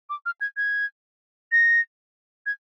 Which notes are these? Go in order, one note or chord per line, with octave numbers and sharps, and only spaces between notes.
D6
F6
G#6
G#6
A#6
G#6